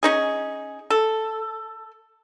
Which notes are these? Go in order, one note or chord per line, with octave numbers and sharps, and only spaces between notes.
C#4 D#4 G#4
A4